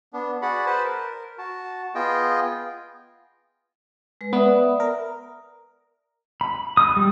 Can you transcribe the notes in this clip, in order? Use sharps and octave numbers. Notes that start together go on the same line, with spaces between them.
B3 D4
F#4 G#4 D5 F#5 B5
B4 C5 A5 B5
A#4
F#4 A5
B3 F4 G#4 D#5 G5
G#3 B4
B3 D5 E5 D#6
A#4
B5
D#6
G3